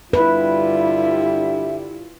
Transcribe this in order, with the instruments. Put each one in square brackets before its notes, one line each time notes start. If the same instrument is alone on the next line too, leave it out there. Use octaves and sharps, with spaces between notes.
[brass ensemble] G2 D3 G3 [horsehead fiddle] E4 F4 [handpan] B4 [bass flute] E5